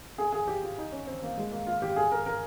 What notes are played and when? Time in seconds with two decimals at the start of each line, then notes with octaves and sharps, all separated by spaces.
0.18 G#4
0.32 G#4
0.48 G4
0.63 F4
0.78 D#4
0.92 C#4
1.07 C4
1.23 A#3
1.37 G#3
1.52 A#3
1.67 F4
1.82 G4
1.96 G#4
2.12 A#4
2.26 A#4